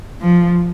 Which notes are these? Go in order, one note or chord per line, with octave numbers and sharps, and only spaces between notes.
F3